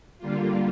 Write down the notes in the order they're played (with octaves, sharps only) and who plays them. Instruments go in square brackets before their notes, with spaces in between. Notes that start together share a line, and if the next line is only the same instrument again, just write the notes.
[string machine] D3 G3 A#3 F4